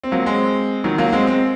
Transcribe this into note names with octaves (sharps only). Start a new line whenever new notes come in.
C4
F#3 A#3
G#3 C4
D#3 F#3
F#3 A#3
G#3 C4
G#3 C4